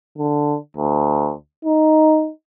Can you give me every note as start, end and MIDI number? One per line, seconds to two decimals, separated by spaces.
0.18 0.57 50
0.76 1.32 38
1.65 2.30 63